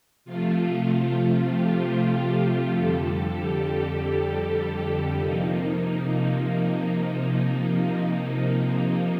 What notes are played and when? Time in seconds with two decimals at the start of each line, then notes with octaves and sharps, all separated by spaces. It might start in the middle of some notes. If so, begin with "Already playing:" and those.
0.25 C3 F3 A3 F4
1.48 G4
2.71 F2 D3 G3 A4
3.32 G4
5.17 C3 F3 A#3 D#4